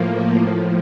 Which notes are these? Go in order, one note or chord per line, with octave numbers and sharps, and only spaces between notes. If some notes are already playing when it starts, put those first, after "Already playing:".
Already playing: A2 F3 A#3
A2 F3